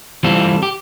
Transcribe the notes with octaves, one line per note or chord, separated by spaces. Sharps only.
E3 G3 C4 F4 A4
G4